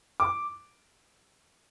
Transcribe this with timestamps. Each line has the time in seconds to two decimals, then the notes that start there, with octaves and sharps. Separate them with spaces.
0.20 D6